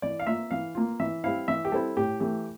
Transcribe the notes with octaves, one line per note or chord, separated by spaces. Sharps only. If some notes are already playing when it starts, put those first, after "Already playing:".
E3 D5
F5
A#3 F4 E5
E3 F5
A#3 F4
E3 E5
G3 C4 E4 F5
E3 E5
G4
G3 C4 E4 A4
A2 G4
E3 A3 G4